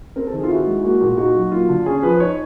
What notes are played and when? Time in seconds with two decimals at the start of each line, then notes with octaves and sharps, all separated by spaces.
0.16 C4 A#4
0.27 A4
0.33 D#3
0.38 G#4
0.43 F4
0.49 E4 F#4
0.67 G#3
0.83 A#3 F#4
1.01 A#2
1.18 D#4 F#4
1.35 F#3
1.52 A#3 F4
1.68 D3
1.86 C#4 G#4
2.02 F3 B4
2.20 D#4 C#5